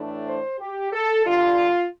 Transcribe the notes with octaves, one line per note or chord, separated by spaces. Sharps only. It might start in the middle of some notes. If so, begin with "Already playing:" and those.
Already playing: A2 E3 A3 D4
C5
G4
A4
G2 D3 G3 F4